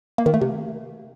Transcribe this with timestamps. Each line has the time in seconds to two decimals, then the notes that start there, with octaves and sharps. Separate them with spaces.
0.18 A#3
0.26 D#3
0.34 A3
0.41 C3